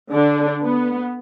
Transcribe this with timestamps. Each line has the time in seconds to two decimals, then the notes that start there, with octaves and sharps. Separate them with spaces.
0.13 D3 D4
0.62 B3